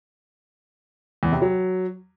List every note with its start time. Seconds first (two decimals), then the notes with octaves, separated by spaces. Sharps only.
1.23 E2
1.32 C3
1.42 F#3